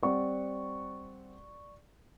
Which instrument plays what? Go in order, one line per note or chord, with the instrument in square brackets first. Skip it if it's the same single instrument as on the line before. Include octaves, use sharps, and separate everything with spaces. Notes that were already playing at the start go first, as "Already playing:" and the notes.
[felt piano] G3 C4 F#5 [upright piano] D5 C#6